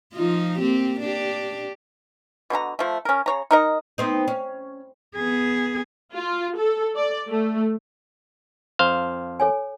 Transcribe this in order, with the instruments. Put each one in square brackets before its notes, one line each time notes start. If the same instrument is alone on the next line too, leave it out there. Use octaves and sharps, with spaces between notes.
[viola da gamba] F3 D#4 F4
A#3 C4 G4
D4 G4
[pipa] B2 D3 E4 A#5
F3 A3
C#4 A#4
C#3 C#5 A#5
D#4 A#4 D#5
[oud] B3 C4 D#4
C#4
[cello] B3 G#4
[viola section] F4
A4
D5
A3
[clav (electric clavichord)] F2 C5 F5
[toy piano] A4 C#5 G#5